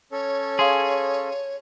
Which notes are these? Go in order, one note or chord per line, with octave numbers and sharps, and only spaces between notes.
C#4 A4 C#5
G#4 F5 C6